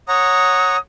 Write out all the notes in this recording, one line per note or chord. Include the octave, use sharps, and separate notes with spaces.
C#5 F#5 A#5 D#6